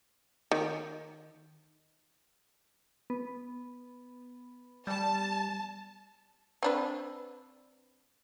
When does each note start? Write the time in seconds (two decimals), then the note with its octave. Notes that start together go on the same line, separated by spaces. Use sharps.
0.51 D#3
3.10 B3
4.87 G3 A5
6.63 C4 D4 B4